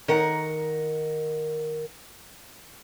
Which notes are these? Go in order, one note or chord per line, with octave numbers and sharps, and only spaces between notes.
D#3 A#4 F#5